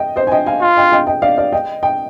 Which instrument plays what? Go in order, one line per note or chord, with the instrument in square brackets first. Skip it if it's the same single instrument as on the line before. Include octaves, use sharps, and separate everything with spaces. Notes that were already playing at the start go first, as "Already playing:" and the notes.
Already playing: [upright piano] D#5 G5
C5 D#5
G#5
D#5 G5
F5 G#5
[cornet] F4
[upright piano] D#5 G5
D#5 G5
D#5 G5
D5 F5
D5 F5
D#5 G5
D#5 G5